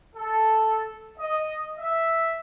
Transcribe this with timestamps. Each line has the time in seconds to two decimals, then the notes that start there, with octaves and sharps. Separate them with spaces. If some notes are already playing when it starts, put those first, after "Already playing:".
0.16 A4
1.19 D#5
1.79 E5